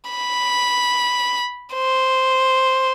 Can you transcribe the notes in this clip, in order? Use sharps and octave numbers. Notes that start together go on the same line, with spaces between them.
B5
C5